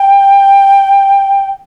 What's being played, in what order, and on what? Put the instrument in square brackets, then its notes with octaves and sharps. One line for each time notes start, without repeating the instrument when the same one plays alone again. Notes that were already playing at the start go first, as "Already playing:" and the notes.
Already playing: [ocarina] G5